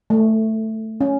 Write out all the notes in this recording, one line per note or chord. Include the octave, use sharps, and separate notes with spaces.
A3
C#4